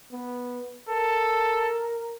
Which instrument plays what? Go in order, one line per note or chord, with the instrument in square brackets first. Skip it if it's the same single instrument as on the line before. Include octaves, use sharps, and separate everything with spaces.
[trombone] B3
[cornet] A4 [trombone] A#4